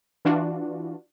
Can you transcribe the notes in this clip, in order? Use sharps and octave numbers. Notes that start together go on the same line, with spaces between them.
E3 D4 F4 F#4